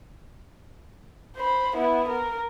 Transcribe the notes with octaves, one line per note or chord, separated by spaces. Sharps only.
C5 B5
B3 E4
A#4